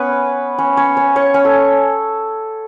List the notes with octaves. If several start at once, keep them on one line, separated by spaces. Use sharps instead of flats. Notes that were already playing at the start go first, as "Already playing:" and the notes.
Already playing: B3 C#4 B4 C#5
C#4 C#5
C#4 C#5
C#4 C#5
C#4 C#5
C#4 C#5
A4